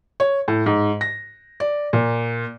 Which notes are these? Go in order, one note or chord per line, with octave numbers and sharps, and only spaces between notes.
C#5
A2
G#2
A#6
D5
A#2